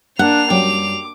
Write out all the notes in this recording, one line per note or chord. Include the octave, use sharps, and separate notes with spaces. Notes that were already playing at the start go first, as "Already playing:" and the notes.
A#3 D4 F#5 C7 F7
F#2 F#3 G3 G5 D6